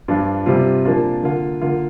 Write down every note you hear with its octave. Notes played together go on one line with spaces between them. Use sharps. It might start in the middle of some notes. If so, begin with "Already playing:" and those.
G2 F3 D4 F4
C3 G3 C4 F4
A#2 F3 A#3 D4 F4
D3 A#3 F4
D3 A#3 F4